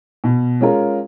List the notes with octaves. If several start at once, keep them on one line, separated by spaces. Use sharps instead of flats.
B2
G#3 C#4 F4 A#4